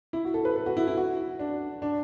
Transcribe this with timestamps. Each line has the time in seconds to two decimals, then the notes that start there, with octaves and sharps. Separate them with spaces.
0.13 E4
0.25 F#4
0.34 A4
0.45 B4
0.56 A4
0.66 F#4
0.77 E4
0.88 E4
0.97 F#4
1.39 D4
1.82 D4